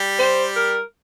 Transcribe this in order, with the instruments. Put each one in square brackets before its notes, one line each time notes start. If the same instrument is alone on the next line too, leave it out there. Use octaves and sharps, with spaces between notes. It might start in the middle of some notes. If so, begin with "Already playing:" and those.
Already playing: [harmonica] G3 G4
[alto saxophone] C5
A#4